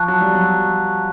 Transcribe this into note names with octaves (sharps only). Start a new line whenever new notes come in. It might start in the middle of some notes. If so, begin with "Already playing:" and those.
Already playing: F3 A5 C#6 F#6
F#3
G3
F#3